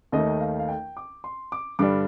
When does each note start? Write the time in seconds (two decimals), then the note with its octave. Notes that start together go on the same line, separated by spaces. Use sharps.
0.12 D#2 D#3 A3 D#4 D#5
0.41 F5
0.59 F5
0.68 G5
0.97 D6
1.24 C6
1.52 D6
1.79 G2 D3 G3 D4 D6